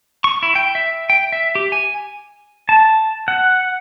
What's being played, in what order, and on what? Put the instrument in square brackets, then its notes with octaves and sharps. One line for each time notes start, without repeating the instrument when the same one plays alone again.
[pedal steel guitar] C#6
E4
G5
E5
G5
E5
G4
G#5
A5
F#5